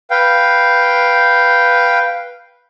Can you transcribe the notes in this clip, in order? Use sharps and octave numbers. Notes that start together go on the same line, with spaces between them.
B4 F5 G5